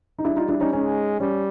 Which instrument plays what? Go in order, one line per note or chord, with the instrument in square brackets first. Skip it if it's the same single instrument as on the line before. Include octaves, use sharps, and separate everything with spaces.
[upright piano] D#4
[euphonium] G3 [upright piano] D4 E4
[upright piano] D#4 F4
D4 E4
C#4 D#4
[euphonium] G#3 [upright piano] C#4 D#4
[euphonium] G3 [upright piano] C#4